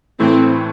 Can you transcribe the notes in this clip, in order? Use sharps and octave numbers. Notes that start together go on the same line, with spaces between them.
A2 E3 A3 C4 E4